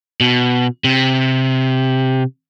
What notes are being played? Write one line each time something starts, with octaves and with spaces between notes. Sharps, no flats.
B2
C3